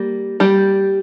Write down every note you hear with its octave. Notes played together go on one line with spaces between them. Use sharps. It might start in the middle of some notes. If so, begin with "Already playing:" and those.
Already playing: G3 A#3
G3 G4